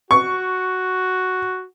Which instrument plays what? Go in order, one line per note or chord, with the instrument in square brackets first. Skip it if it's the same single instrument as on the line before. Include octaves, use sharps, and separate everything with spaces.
[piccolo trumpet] F#4 [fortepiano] C#6